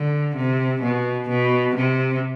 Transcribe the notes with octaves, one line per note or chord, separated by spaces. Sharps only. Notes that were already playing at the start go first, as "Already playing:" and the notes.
Already playing: D3
C3
B2
B2
C3